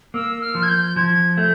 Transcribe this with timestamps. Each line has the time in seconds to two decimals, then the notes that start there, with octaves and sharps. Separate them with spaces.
0.14 A#3 E6
0.42 F6
0.55 F3
0.63 G#6
0.68 G6
0.96 F3 G#6
1.37 A3 G6